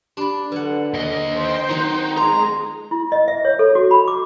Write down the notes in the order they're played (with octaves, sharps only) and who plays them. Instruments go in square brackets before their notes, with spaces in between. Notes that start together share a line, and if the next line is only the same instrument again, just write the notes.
[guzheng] D4 D5 [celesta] G4 B5
[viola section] D3 [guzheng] F#3 F#5 [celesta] B4
[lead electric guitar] D#2 D#5
[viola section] C5 G5
[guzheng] D#3 F#3 C4 [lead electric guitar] D#4
[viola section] G#3 G#4 [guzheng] F4 [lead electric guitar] A#5 [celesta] C6
[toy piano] E4
D#5
E5
C#5
A4
F#4
B5
D6